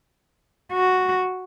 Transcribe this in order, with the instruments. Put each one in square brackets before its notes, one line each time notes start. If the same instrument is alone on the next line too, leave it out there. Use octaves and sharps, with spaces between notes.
[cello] F#4